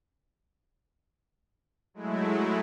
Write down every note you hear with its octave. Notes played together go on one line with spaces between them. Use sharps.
F#3 G#3 A3 E4